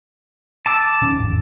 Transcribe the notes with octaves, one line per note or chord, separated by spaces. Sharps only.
A5 D6 E6
D#1 D#3 C#4
D1 G#1 E2